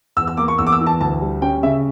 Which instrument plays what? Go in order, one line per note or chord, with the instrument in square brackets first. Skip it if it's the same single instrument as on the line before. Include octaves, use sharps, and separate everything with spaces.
[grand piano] E2 E6
E6
A#3 D6
C#6
E2 E6
D6
E6
E3
A5
D2 A5
G3
C#4 G5
C#3 E5